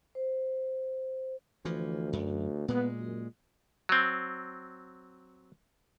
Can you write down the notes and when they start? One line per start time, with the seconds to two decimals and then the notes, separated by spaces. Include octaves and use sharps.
0.15 C5
1.65 D2 E3 F3
2.13 F#2
2.68 A#2 G#3 B3
2.99 F#2
3.89 F#3 C4